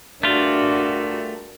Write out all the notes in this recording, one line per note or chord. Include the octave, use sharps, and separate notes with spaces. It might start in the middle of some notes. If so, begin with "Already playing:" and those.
G2 A3 D4 F4 F#4 G#4 A#4 E5